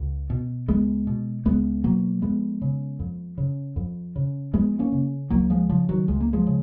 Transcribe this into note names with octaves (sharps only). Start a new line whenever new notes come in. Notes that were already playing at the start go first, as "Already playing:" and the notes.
Already playing: C#2
B2
C#2 G#3 B3
B2
C#2 G#3 B3
B2 F#3 A#3
F2 G#3 B3
C#3
F2
C#3
F2
C#3
F2 G#3 B3
A#3 C#4
C#3
C#2 F#3 A#3
F3 G#3
C#3 F3
D#3 F#3
C#2 G#3
A#3
F3 G#3
C#3